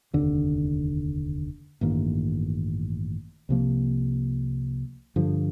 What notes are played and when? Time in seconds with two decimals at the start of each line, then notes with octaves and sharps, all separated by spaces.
0.14 F1 D#2 D3
1.81 A1 G2 D#3 A#3
3.49 C2 C3 F3 A#3
5.16 G2 D3 F3